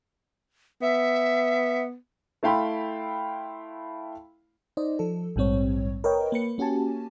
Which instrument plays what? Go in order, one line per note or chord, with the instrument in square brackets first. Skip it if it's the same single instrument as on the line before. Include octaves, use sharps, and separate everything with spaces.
[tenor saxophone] B3 [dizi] E5
[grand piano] A3 E4 F5 G5 B5 C6
[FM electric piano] D#4 C5 D5 D#5
F3 A4
A#1 G#2 G3 C4 C#5
A#4 B4 C#5 D#5 G5
A#3 B4 C#7
A#3 C#4 F#4 G4 G#5 A5